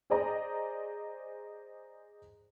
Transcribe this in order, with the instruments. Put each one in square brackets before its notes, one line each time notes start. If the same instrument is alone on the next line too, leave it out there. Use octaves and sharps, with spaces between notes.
[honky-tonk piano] G#4 C5 D5 D#5 A#5